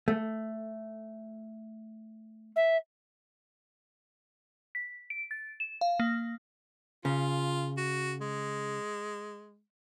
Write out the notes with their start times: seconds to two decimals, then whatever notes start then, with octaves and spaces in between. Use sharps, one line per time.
0.08 A3
2.56 E5
4.75 B6
5.10 D7
5.31 A6
5.60 E7
5.81 F5
6.00 A#3
7.05 C#3 F4
7.77 F#4
8.21 G#3